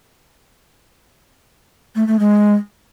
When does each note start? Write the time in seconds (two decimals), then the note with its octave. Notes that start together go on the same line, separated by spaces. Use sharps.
1.95 A3
2.07 A3
2.19 G#3